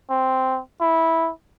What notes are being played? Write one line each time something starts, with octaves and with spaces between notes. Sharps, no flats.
C4
E4